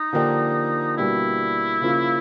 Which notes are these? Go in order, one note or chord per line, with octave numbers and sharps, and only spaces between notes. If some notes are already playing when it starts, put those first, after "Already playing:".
Already playing: D#4
D3 F3 A#3 D4 G4
B2 G3 A#3 D4 E4
C#3 F3 A#3 C#4 F4